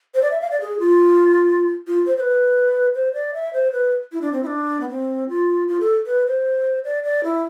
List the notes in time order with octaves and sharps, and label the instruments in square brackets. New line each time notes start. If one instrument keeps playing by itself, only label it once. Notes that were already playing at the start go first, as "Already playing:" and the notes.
[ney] C5
D5
E5
F5
D5
G#4
F4
F4
C5
C5
B4
C5
D5
E5
C5
B4
E4
D4
C4
E4
D4
B3
C4
F4
F4
A4
B4
C5
D5
D5
E4